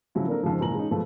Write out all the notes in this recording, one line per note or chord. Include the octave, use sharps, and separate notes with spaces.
C#3 F3 F#3 E4
A#3 C4 D4 A4 A#4
F2 G#2 C#3 F3
C#2 A#2 E3 A#5 F#7
G#3 C#4 D#4
B2 F3 F#3 G#3 A3